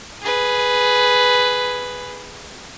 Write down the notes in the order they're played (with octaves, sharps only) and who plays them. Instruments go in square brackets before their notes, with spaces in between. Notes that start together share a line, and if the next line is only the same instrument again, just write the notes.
[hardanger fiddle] G#4 B4